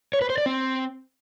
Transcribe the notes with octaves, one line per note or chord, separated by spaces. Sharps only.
C#5
B4
C5
D5
C4